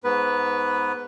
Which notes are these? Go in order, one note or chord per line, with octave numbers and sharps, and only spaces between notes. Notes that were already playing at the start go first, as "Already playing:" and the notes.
G#2 B3 B4